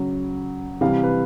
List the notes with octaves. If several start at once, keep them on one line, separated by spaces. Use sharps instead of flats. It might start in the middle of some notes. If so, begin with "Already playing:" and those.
Already playing: C#3 F#3
C3 E3 G3 F5
B4